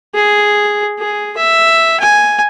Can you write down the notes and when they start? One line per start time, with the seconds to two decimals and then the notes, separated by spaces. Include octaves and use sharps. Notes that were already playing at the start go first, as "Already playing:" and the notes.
0.14 G#4
0.99 G#4
1.37 E5
2.00 G#5